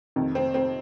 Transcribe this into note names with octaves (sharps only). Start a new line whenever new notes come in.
F2 C3 D#3
C4
C4